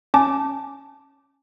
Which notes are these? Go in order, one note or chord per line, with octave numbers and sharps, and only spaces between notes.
C#4 A5 D6